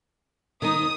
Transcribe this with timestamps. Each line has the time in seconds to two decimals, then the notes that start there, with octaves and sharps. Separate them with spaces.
0.62 D#3 D#4 D#6